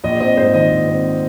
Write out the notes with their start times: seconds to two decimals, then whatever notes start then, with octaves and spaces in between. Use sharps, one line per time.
0.04 A#1 D#5
0.20 C4 D#5
0.37 G#2 C5
0.54 D#3 D#5
0.71 A#1
0.88 C4